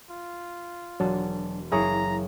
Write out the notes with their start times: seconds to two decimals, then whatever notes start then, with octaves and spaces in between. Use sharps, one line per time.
0.10 F4
1.00 E1 F#3 D4 A5
1.72 F#1 E4 G#4 C#5 A#5